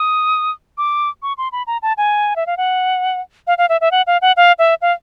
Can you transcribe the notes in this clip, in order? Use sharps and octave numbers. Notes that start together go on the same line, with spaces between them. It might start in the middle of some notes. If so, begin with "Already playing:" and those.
Already playing: D#6
D6
C#6
C6
B5
A#5
A5
G#5
E5
F5
F#5
F5
F5
E5
E5
F#5
F5
F#5
F5
E5
F5